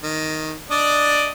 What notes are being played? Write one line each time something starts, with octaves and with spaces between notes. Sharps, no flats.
D#3
D4 D5 D#5